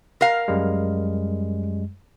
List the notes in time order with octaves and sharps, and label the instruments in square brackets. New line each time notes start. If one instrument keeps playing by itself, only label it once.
[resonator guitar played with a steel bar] A#4 F5
[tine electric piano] F#2 G3 G#3